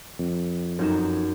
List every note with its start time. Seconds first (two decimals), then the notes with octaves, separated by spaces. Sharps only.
0.19 F2
0.79 F#2 D#4 E7